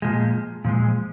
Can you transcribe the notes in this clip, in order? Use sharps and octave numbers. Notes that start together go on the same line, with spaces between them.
A#2 F3 G#3
A#2 F3 G#3